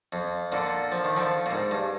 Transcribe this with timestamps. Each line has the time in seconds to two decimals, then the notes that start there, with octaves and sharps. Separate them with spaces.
0.13 F2
0.52 A#2 D3
0.92 F3
1.04 D#3
1.17 D3 F3
1.46 A#2
1.51 G#2
1.71 G2